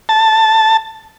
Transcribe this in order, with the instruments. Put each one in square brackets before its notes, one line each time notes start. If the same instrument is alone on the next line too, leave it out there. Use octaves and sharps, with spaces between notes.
[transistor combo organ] A5